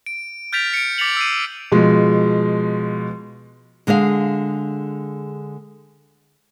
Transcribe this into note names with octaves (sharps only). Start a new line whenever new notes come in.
D7
F6 G6 A6 B6 D7 F7
C#7 D7
D6 A6 B6 C#7 F7 F#7
E6 C7 D#7
B2 F3 G#3
D3 G#3 G#4 F5